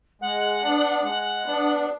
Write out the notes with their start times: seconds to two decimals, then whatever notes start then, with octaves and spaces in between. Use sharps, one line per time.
0.21 G#3 F#5
0.62 B3 D4
1.03 G#3 F#5
1.45 B3 D4